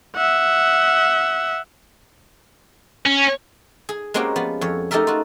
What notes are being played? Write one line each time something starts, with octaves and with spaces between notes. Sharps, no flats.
E5 F#5
C#4
G#4
G#3 A#3 C4 C#4 F#4 G4
F3 B3
F2 C#5
A3 D#4 G4 A4 A#4 E5
F4 F#4